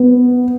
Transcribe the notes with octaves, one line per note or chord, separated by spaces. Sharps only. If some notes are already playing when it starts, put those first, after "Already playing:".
Already playing: B3